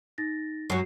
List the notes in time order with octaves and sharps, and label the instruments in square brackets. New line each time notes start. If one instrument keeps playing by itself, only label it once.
[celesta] D#4 A6 A#6
[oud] F#2 F#3 [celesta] F#4 C7